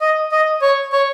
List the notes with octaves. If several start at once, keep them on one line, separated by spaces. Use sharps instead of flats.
D#5
D#5
C#5
C#5